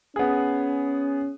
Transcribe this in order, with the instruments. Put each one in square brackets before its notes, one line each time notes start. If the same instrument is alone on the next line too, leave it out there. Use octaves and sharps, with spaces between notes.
[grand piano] B3 G#4 [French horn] C#4